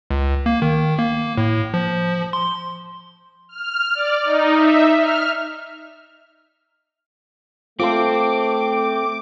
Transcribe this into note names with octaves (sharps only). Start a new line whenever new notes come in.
C#2
A#3
D#3
A#3
A2
F3
C6
F6
D5
D#4
E5
F6
A3 C4 F4 A4 C6 D6